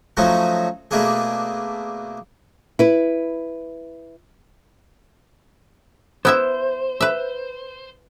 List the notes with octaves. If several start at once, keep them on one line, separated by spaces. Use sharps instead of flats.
F3 F#3 A3 C#4 D#4 F#4
B2 A3 A#3 D4 G#4
E4 B4
B3 E4 C5 E5
B4 E5